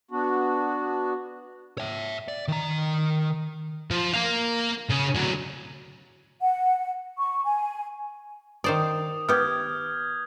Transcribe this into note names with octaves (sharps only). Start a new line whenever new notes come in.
B3 D4 F#4
C#5 E5
D5
D#3 A#5
F3
A#3 F5
C#3
D3 F#3
F#5
C#6
G#5
D#3 C5 D5 D#6
B3 G4 F6 G6 G#6